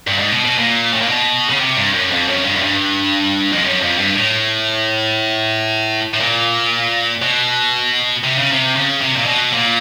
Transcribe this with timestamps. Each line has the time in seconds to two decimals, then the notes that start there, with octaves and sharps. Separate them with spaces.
0.07 G2
0.19 G#2
0.32 B2
0.45 B2
0.58 A#2
0.93 A2
1.02 A#2
1.09 B2
1.50 C#3
1.60 C3
1.77 G2
1.94 F#2
2.11 F2
2.28 F#2
2.45 G2
2.56 F#2
2.62 G2
3.53 F2
3.65 F#2
3.82 F2
3.98 G2
4.15 A2
6.14 A2
6.20 A#2
7.22 B2
8.24 C3
8.38 C#3
8.52 C3
8.76 C#3
9.01 C3
9.16 A#2
9.26 B2
9.52 A#2